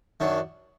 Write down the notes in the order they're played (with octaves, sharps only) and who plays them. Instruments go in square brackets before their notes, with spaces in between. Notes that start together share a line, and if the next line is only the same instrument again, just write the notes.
[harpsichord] F#2 D#3 F#3 D4